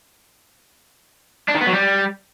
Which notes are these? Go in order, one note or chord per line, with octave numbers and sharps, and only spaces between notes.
D4
D#3
B3
F#3
G3